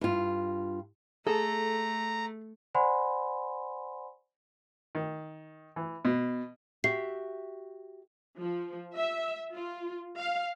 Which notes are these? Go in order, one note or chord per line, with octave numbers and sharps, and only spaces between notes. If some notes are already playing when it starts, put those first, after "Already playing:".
G2 F4
A3 G#4 A4 A5 A#5
C5 D5 F#5 G#5 B5 C6
D#3
E3
B2
F#4 G4 E5 C7
F3
E5
F4
F5